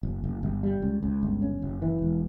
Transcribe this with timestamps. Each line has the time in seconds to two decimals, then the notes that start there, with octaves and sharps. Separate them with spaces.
0.03 F#1
0.24 F#1
0.43 G1
0.63 G3
0.82 C#2
1.03 C#2
1.23 G1
1.42 C#4
1.62 F#1
1.82 E3
2.02 E1